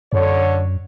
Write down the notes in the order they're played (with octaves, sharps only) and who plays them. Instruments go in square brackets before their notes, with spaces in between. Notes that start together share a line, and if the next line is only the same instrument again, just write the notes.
[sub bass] F#2 [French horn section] D3 C#5